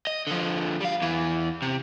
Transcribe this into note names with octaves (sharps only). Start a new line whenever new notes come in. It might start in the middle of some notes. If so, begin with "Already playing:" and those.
D#5
D3 F3
G3 F5
E2 E3
C3